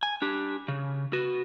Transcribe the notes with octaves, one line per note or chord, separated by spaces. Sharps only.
G#5
D4 G4
C#3
F#4 B4